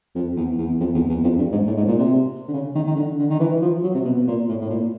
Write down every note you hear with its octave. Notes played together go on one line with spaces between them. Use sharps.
F2
E2
E2
F2
E2
E2
F2
G2
G#2
A2
G#2
A#2
C3
D3
C#3
D#3
D#3
D3
D3
D#3
E3
F3
F#3
C3
B2
B2
A#2
A2
A2
A#2